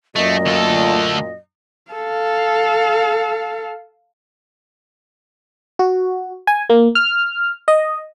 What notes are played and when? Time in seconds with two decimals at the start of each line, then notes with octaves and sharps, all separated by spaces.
0.16 F#2 A#2 A3 D#5
0.46 D2 A4
1.91 A4 F5
5.79 F#4
6.47 G#5
6.70 A#3
6.95 F6
7.68 D#5